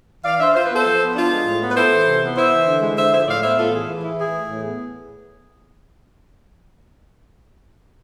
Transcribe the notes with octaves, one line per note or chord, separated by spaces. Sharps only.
E3 D5 F5
D4 C5 E5
F4 C5
B4
B3 A4 C5
F3
B3
D4 F4
G#3
A2
B3
B4
E4 A4 C5
E3
C3
B3
E4 C5 E5
E3
D3
G#3
D3 C5 E5
F3 C5 E5
A2 D5 F5
B3 C5 E5
A2 F4 A4
E3 G#4
E3
E4
E3 G#4
A3
A2
B3